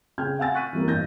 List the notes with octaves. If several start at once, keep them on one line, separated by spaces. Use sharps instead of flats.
C#3 G#4 G5 F6 G6 G#6
F5 F#5 G#5 E6 A6 A#6
C#6 F#6 B6 D#7
E3 G3 A#3
A1 G2 G6 A#6